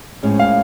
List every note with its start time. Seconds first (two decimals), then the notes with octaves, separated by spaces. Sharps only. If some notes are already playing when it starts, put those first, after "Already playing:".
0.23 A2 F3 G#3 C#4
0.39 F5